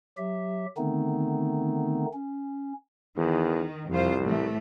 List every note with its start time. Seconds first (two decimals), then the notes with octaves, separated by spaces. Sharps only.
0.17 F#3 G4 E5
0.77 D3 D#3 A3 B3 C4 D#4
2.13 C#4
3.17 E2 D#3
3.90 C2 F2 F4 C5
4.22 A2 E3 A3